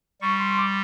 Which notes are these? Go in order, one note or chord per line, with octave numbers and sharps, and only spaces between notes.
G3 C#6
C6
D6